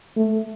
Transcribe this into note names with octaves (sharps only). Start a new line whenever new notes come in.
A3